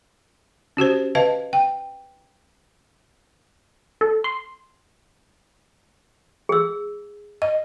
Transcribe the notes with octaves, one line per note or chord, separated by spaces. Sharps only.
C#4 F#4 G4 C5
B4 D#5 F5 A5
G5
A4
C6
G#4 E6
D#5